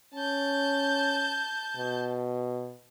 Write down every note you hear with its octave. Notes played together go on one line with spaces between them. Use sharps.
C#4 A5 G6
B2